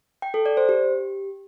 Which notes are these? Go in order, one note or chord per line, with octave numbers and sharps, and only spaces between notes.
G5
A4
D5
C5
G4